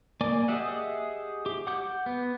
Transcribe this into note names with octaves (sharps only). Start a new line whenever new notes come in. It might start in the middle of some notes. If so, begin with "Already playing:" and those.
A#3 D5 G#5 D6
G4 G#4 D#5 E5 F#5
G4
F#5 D6 G6
B3